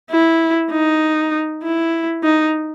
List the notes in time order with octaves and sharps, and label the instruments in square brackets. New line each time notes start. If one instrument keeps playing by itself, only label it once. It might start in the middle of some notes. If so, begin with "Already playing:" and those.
[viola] E4
D#4
E4
D#4